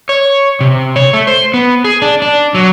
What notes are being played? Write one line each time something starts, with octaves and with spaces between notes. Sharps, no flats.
C#5
C3
C#5
A3
C5
B3
G#4
D4
D4
F#3